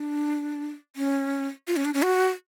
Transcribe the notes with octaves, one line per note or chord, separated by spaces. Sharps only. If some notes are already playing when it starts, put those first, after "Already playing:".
Already playing: D4
C#4
F4
C#4
D4
C#4
F#4